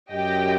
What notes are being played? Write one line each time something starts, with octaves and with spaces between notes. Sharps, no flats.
F#2 G4 D#5 G5